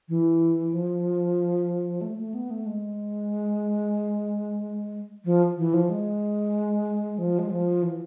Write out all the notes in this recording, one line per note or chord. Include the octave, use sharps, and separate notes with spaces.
E3
F3
A3
A3
B3
A3
G#3
F3
E3
F3
G#3
F3
G#3
F3
E3